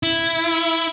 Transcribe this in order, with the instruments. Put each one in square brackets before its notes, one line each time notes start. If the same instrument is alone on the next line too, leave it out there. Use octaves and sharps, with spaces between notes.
[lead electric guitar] E4